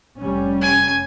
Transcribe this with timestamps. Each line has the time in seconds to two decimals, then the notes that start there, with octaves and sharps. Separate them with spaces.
0.19 F1 G3 C#4
0.61 G#5